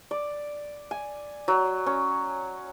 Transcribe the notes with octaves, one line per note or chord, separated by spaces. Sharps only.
D5
G#5
F#3
C#4